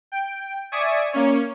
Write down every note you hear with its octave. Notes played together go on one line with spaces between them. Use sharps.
G5
D5 E5 G#5 C#6 D#6 G#6
A#3 C#4 C#5